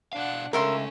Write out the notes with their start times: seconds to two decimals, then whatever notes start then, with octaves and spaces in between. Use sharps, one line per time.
0.13 B2 D4 F5 F#5
0.53 C#2 A3 C#4 D#4 A#4 E5 C6